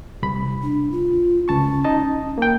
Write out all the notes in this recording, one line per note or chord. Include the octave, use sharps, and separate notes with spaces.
C2 B5
D4
F4
C#2 C#4 A5 C#6
D#4 D#5 A5
A#3 G5